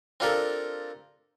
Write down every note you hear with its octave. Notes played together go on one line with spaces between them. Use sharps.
C4 D4 F4 G4 A4 A#4